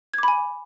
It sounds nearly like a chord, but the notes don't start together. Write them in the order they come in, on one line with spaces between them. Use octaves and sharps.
G#6 D6 B5 G#5